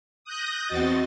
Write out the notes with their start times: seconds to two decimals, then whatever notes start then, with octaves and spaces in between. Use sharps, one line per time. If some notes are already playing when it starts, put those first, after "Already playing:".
0.24 D#6 F#6 G6 A#6
0.67 E2 C4 F#4 D#5 A6